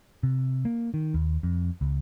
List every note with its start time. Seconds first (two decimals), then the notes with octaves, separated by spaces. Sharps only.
0.23 C3
0.65 A#3
0.94 D#3
1.14 D#2
1.43 F2
1.81 C#2